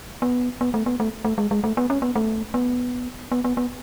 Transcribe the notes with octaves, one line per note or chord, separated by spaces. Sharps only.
B3
B3
A3
B3
A3
A3
G#3
G#3
A3
B3
C#4
B3
A3
B3
B3
B3
B3